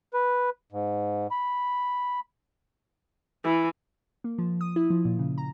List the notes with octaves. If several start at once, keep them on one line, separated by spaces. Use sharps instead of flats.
B4
G#2
B5
E3
A#3
F3
D#6
E4
F3
A#2
C#3
A#5